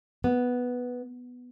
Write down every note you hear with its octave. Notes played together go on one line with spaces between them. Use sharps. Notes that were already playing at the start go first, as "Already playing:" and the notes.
B3